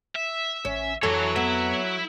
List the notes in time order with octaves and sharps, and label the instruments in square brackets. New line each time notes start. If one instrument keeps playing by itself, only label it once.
[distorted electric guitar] E5
[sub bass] A1 [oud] C#4
[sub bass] F2 [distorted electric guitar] E3 [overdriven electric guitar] F#3 C#5 [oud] A4
[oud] B3 [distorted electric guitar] E4 E5